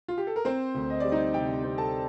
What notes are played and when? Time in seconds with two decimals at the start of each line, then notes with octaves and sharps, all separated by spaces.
0.08 F4
0.18 G4
0.27 A4
0.36 A#4
0.45 C4 C5
0.74 D2
0.90 D#5
1.00 G3 D5
1.11 D#4 D#5
1.34 C3 G4 G5
1.64 C4
1.78 A4 A5